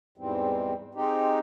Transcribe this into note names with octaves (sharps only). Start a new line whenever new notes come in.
E2 G#2 E3 G3 C4
G#3 C4 D#4 G4